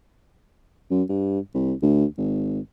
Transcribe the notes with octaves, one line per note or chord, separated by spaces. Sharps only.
F#2
G2
C2
D2
G#1